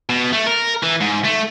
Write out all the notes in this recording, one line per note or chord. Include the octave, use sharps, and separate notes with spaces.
B2
A3
A#4
E3
G#2
A3